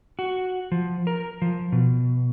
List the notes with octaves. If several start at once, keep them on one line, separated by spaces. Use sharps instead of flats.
F#4
F3
A#4
F3
B2